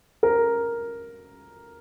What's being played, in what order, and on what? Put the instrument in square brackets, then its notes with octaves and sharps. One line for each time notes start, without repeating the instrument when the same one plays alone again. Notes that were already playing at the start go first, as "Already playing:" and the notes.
[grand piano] A#4